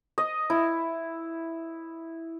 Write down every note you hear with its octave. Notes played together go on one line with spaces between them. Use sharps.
D#5
E4